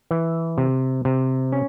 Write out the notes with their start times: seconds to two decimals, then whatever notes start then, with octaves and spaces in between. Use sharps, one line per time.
0.11 E3
0.58 C3
1.05 C3
1.52 C#4